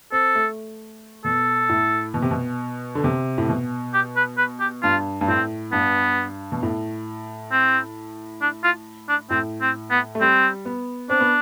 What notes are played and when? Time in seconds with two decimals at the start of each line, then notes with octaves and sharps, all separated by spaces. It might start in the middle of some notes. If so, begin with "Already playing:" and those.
0.12 C4 A4
0.35 A3
1.25 B2 A4
1.69 A2
2.14 B2
2.22 C3
2.31 B2
2.95 D3
3.04 C3
3.38 A2
3.48 B2
3.94 G4
4.16 B4
4.38 B4
4.60 G4
4.83 G2 F4
5.21 G2
5.28 A2 C4
5.72 G2 B3
6.52 B2
6.63 A2
7.52 C4
8.41 D4
8.64 F4
9.09 D4
9.30 A2 C4
9.61 C4
9.90 B3
10.15 A3
10.20 G3 C4
10.65 B3
11.10 C4 D4
11.20 B3